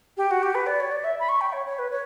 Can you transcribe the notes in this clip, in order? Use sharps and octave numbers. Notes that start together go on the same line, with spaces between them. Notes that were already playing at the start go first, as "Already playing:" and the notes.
G4
F#4
G4
B4
D5
C#5
D5
E5
B5
C#6
G5
C#5
C#5
B4
C#5